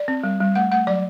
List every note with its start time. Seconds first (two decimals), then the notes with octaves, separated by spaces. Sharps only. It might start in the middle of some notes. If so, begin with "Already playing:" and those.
Already playing: D5
0.08 C4
0.24 G3
0.40 G3
0.55 A3 F#5
0.71 A3 F#5
0.87 F#3 D5